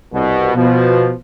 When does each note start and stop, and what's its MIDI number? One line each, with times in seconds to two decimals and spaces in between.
0.13 0.51 36
0.13 0.51 47
0.55 1.11 47
0.55 1.11 53